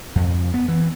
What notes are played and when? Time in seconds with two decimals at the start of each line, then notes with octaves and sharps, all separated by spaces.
0.16 F2
0.54 B3
0.68 E3